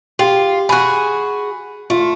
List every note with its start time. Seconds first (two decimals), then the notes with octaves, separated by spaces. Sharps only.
0.19 F4 G4
0.69 F#4 G#4 B5 F#6
1.90 A3 F4